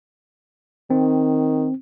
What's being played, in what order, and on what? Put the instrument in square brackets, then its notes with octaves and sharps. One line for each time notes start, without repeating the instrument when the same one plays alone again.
[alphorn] D#3 [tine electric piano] C4